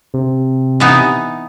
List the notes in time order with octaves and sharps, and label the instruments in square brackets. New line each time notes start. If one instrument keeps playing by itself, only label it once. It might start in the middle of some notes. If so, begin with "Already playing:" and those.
[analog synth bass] C3
[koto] E3 B3 D#4